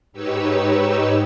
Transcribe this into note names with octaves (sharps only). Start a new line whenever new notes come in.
G#2 D#4 G4 B4 C#5 E6